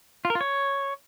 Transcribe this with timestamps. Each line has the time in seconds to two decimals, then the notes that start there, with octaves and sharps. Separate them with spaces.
0.25 F4
0.30 A#4
0.35 F4
0.41 C#5